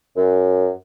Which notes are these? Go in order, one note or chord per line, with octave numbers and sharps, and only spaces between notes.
F#2